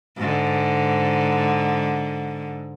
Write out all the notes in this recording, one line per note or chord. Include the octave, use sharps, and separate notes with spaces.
G#2 D3